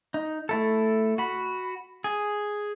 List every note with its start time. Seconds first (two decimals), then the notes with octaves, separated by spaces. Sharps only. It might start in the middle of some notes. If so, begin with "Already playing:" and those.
0.14 D#4
0.49 A3 E4 A4
1.18 F#4 B5
2.04 G#4